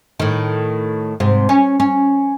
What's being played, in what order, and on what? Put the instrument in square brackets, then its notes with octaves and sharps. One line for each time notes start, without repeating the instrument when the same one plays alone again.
[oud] A2 D#3
G#2 C3
C#4
C#4